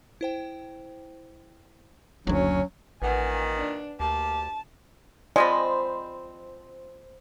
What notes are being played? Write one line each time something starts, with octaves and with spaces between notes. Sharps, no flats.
E4 C5 G5
F#1 D2 F#3 C#4
A1 A#2 D#3 B4 F#5 G#5
D4
D2 A#3 G4 A5
F3 G#3 C4 C5 D5 D#5 G#5 B5